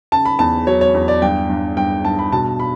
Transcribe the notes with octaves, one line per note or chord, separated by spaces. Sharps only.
C#3 A5
B5
E2 A5
F#3 C#5
C#5
E2
D5
G2 G5
G2
G2 G5
G2 A5
B5
B2 A5
B5